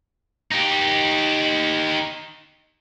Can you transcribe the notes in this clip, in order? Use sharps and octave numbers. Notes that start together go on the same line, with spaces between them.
D#4 G4